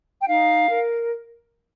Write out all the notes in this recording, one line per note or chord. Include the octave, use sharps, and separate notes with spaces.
G5
D#4 F5
A#4